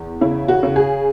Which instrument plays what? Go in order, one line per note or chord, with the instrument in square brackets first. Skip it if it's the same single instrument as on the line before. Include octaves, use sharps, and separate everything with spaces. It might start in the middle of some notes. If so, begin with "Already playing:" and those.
Already playing: [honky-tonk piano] E2
C#3 E4
F#4
C#3
G#4